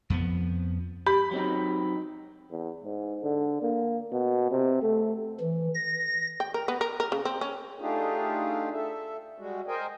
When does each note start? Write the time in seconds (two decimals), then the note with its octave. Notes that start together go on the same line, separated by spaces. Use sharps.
0.10 F2 F3 B3
1.07 G4 B5
1.31 F#3 C4 D#4
2.51 E2
2.84 G#2
3.23 D3
3.62 A#3
4.12 B2
4.51 C3
4.82 A3
5.40 E3
5.75 A#6
6.40 G5
6.54 A#4
6.68 B3
6.81 A#4
7.00 A#4
7.12 C#3
7.25 C4
7.41 C#4
7.81 A3 D4 D#4 F4 G4 G#4
8.73 A4 E5
9.38 G3 G#3 F#4
9.68 A#4 C5 D#5 G5 G#5